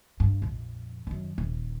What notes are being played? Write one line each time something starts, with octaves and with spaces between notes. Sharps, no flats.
G2
A#1 F2
F#2 D#3
D#1